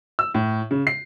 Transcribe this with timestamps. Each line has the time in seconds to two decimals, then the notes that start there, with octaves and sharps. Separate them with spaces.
0.19 E6
0.34 A2
0.71 C#3
0.87 C7